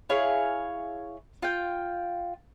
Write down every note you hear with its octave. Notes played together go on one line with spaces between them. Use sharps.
E4 G#4 C#5 F5
F4 G5